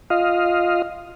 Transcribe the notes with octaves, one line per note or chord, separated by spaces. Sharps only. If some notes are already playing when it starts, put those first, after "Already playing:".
F4 D#5 F5